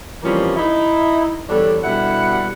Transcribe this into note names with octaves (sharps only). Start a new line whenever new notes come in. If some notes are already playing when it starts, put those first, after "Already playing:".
E3 F3 G3 A#3 C4 C#4
D#4 E4
E2 D3 G3 D4 A4 C#5
B2 D3 G3 E4 F#5